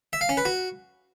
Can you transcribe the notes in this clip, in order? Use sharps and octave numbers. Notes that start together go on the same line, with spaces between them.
E5
F5
C#4
B4
F#4